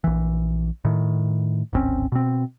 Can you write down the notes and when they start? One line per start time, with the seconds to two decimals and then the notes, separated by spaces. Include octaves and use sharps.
0.04 A#1 E3
0.85 A2 D#3
1.73 D1 G#1 C4 C#4
2.12 B2 C4